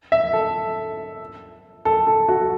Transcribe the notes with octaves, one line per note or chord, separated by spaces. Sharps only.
E5
A4
A4
A4
F#4